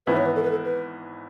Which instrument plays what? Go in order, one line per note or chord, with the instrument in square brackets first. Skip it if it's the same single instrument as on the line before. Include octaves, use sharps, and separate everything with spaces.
[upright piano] G#1 G#2 E3 B3 E4 [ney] B4
[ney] C#5
B4
A4
B4
A4
B4